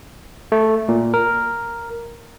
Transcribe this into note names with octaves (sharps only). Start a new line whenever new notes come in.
A3
A#2
A#4